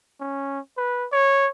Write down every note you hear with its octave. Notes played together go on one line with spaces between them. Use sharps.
C#4
B4
C#5